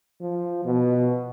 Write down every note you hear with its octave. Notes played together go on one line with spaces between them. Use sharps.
F3
B2